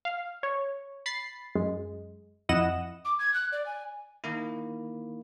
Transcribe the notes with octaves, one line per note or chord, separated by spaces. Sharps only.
F5
C#5
B5 A6 C7
F#2 G#3
F2 E4 D#5 F#5 E7
D6
G#6
F#6
D5
G#5
D#3 A#3 E4